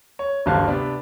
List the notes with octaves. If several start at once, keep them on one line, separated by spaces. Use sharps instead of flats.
C#5
D1 G1 G2 D3 F5 A5
C3 B3 D4